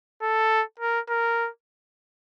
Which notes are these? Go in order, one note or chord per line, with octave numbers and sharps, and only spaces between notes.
A4
A#4
A#4